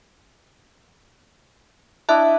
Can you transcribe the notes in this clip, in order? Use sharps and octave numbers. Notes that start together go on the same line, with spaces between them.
D4 E4 D#5 E5 A5 F#6